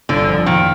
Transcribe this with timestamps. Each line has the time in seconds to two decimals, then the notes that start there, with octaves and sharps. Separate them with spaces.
0.09 G1 D3
0.28 F2
0.46 A#2 D#3